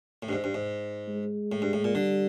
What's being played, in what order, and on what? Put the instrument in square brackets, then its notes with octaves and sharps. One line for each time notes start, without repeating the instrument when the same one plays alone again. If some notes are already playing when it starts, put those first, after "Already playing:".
[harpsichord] A2
G2
G#2
G2
G#2
[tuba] G#3
[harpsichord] A2
G2
A2
A#2
[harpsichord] D3 [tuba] G3